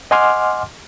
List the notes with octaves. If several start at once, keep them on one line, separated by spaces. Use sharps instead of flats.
D#5 F#5 G#5 C6 D6 F6